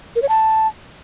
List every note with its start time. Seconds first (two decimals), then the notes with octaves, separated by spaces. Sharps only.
0.16 A#4
0.22 C#5
0.29 A5